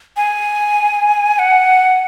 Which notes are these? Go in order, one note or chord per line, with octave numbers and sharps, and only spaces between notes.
G#5
F#5